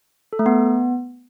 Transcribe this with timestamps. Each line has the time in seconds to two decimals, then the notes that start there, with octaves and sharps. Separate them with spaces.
0.33 A4
0.39 A3
0.46 B3